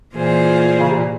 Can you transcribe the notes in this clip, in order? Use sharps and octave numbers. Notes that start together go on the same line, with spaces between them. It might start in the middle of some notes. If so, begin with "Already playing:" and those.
A#2 E3 A#3 F4 G#4 C5
C#3
C3
A#2